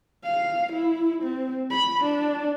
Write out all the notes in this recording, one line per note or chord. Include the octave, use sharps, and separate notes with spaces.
F5
E4
C4
B5
D4